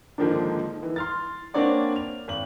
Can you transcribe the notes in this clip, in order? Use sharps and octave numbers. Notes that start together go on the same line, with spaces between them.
G#2 D3 D#3 F3 A#3 D4
E3
C6 F6 A6
A#3 C4 D4 C#5 D5 F#5
F7
G#1 F#7